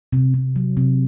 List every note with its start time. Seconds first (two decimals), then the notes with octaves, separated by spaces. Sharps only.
0.13 C3
0.34 C3
0.56 F#3
0.77 C3